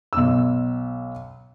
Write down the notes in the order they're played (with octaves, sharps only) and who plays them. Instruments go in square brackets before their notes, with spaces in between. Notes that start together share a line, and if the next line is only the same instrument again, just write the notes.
[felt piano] B1 E6